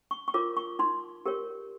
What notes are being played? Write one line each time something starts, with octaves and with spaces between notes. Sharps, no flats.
C#6
C#6
F4 A#4 C#5 D6
C#6
D#4 C6
G4 A#4 C#5